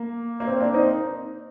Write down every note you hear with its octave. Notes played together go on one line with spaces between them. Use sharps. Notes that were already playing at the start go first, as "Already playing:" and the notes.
Already playing: A#3
A#3
C4
A#3 D4
C4 D#4